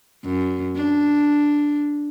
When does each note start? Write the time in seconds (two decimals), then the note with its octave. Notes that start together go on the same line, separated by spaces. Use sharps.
0.24 F#2
0.76 D4